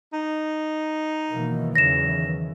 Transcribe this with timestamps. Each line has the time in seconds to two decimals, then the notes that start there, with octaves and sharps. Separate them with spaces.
0.13 D#4
1.31 B2 D#3 E3 F#3 A#3
1.76 E2 C#3 A#6 E7